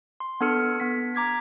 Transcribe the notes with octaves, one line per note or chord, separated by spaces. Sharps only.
C6
B3 D4 A4 F6 C#7
B3 B6
A#5 D6 G#6 B6